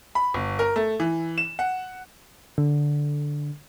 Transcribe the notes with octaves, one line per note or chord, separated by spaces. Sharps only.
B5
G1
A#4
A3
E3
E7
F#5
D3